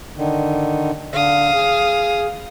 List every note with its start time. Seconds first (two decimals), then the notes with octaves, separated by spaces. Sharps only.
0.17 D3 D#3
1.13 D3 F5 D#6
1.55 G#4